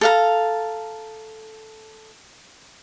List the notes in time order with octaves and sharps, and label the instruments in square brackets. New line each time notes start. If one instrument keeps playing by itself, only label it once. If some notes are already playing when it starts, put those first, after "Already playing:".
[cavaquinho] A4 F5 A#5